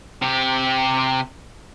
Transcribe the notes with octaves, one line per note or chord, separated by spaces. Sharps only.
C3 G4